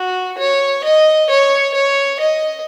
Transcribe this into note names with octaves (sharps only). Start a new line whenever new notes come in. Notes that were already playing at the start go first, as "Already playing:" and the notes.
Already playing: F#4
C#5
D#5
C#5
C#5
D#5